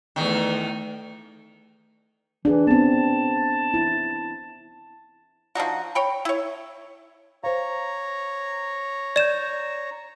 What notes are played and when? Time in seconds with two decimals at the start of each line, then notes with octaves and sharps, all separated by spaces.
0.16 E2 D#3 A3
2.45 E3 D4 G#4
2.67 B3 C4 A5
3.74 E4
5.55 F3 D4 D#4 F#4
5.95 C#5 G5 B5
6.25 E4 C#5
7.44 C5 C#5 F5 A#5
9.16 D5 G6 A6 E7